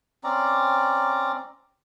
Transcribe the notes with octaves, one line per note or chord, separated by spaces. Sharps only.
C4 C#4 D5 A#5